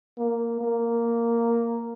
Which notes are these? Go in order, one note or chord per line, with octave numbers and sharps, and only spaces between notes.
A#3
A#3